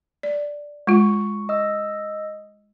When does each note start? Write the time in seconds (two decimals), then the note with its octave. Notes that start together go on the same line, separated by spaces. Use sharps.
0.23 D5
0.87 G#3 F4 C#6
1.49 D#5 E6